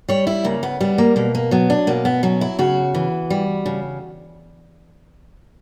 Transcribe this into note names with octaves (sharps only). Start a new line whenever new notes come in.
G3 C#5
E4
C#3 A#3
B3
G3 B3
A#3
B2 A#3
A#3
F#3 B3
D4
B2 A#3
B3
F#3 C#4
E4
C#3 F#4
E3
G3
C#3